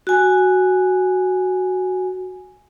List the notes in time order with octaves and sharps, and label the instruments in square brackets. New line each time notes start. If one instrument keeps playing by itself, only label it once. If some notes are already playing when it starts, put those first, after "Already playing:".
[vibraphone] F#4 G#5